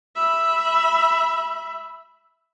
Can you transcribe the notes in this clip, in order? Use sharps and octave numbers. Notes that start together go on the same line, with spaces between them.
E5 B5